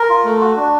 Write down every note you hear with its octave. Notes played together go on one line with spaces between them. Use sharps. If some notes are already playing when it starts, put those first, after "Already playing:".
Already playing: A#4
F4
A3
F#4
D4